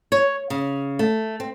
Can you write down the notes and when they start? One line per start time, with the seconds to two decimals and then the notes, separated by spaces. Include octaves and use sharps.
0.12 C#5
0.50 C#3
0.99 A3
1.40 C4